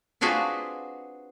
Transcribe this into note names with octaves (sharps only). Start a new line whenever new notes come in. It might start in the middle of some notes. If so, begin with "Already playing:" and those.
C4 D4 F4 F#4 G#4 B4